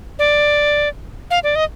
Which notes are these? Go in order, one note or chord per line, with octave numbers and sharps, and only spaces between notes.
D5
F5
D5
D#5